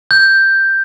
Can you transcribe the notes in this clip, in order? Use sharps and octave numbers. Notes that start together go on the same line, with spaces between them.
G6